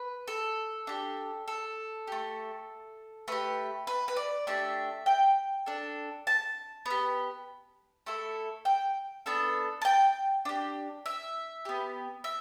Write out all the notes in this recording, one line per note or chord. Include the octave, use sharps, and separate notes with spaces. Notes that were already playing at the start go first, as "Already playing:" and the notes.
Already playing: B4
A4
D4 G4
A4
A3 G4
A3 G4 B4
B4
B4
D5
A3 D4 G4 E5
G5
D4 A4
A5
B3 G4
A3 E4 A4
G5
B3 D4 A4
A5
G5
D4 G4
E5
B3 G4
E5